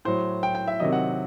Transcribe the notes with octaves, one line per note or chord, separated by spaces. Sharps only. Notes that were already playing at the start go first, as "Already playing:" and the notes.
A2 F#3 C5
G5
G5
E5
C3 D#3 F#3 D#5
F#5